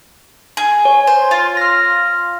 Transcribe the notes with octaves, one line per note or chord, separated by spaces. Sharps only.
G#4
C#5
C5
F4
F6 A#6